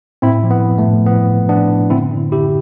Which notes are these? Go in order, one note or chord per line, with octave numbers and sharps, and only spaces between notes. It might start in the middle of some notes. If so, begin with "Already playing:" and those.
A2 C4 E4
F3
B3
F3
A3
A2
F3 B3
A2
F3 B3 D4
A2
D3 C4 E4
D3
D3 E4 G4